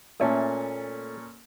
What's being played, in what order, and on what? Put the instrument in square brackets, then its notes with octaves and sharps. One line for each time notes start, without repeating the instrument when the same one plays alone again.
[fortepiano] A#2 C#4 A4 [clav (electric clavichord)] A3